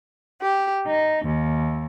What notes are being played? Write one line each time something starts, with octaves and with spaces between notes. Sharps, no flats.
G4
D#4
D#2